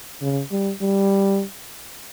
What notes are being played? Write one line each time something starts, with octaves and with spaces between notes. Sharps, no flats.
C#3
G3
G3